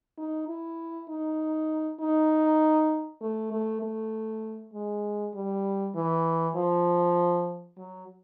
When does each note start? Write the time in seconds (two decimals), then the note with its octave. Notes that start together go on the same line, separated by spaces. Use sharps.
0.18 D#4
0.49 E4
1.09 D#4
2.00 D#4
3.21 A3
3.52 A3
3.82 A3
4.74 G#3
5.35 G3
5.95 E3
6.56 F3
7.78 F#3